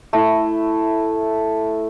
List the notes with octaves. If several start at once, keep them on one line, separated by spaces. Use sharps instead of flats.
A3 E4